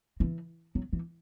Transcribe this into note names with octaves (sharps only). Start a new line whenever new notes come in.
E3
F#3
E3